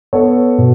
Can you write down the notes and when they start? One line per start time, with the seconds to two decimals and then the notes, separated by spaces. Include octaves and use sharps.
0.13 B3 A4 C#5
0.58 B2